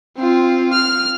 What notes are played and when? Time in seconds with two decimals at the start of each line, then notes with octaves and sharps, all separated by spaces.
0.17 C4 F4
0.73 F6